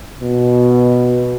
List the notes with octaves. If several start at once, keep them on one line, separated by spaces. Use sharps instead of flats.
B2